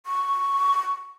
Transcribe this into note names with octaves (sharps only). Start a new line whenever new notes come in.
C#6